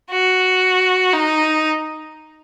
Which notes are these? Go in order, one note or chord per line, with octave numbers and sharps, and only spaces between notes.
F#4
D#4